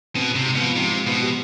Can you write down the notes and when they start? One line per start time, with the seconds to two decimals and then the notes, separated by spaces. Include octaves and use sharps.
0.15 B2 C4
0.31 C3 C4
0.46 G#2
0.56 B2
0.61 F3
0.76 G#2 C3
0.91 G#2
1.07 B2 F3
1.22 G4